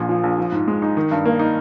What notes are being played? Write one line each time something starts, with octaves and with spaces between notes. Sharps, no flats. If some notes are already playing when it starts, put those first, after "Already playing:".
Already playing: A#1 A#2
F3
A#1
F3
G#2
G#3
D#4
D#3
G2
A#3
D#4